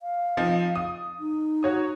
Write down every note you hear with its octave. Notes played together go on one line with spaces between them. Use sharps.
F5
F3 C4 D#4
D#6
D#4
F#4 C#5 D#6